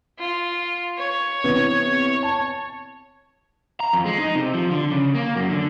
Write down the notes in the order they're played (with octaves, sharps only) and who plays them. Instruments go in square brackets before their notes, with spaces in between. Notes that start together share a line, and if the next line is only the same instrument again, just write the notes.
[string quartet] F4
C#5
[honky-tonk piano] C3 E3 B3
A5
[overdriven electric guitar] A#5
F2
G#3
D#4
C3
F3
D3
C#3
A#3
F#2
D3